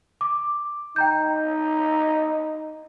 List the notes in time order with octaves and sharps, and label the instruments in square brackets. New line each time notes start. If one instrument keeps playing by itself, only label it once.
[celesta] D6
[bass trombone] D#4 [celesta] G5 A#5 G6